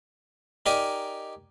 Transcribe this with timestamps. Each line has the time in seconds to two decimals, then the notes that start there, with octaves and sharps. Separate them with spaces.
0.66 D#4 G4 A#4 D5 G#5